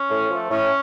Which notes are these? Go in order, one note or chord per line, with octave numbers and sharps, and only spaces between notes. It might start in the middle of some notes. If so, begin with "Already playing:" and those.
Already playing: C#4
A2
F3 A3
A2 C#4